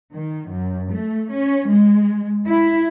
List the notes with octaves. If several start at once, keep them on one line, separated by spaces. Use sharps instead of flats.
D#3
F#2
A3
C#4
G#3
E4